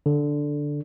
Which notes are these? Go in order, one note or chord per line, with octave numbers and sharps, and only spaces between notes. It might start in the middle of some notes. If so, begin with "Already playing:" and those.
D3